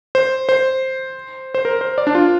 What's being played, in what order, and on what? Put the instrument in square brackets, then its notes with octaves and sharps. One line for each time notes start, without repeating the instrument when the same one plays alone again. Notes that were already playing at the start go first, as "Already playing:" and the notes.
[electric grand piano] C5
C5
C5
A#4
C5
D5
D4
F4